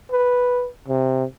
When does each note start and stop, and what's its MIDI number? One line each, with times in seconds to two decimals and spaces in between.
0.11 0.68 71
0.88 1.24 48